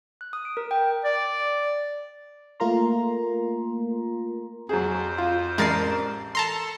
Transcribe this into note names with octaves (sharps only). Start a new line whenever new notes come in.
F#6
D#6
D7
A#4
G5
D5
A3 A#3 F4 A#4 A#5 C6
F2 F#3 G#4 C5
F4
A1 G#3 A#4 D5 A6 C7
A4 A5 A#5 C6